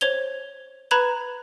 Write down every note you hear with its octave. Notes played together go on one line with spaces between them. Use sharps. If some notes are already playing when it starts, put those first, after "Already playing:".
C5 C#5 G#6 F7 G7
B4 A#5 B5 F#6 G#6 E7